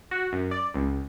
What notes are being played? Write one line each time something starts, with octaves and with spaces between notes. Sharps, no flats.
F#4
F#2
D5
C#2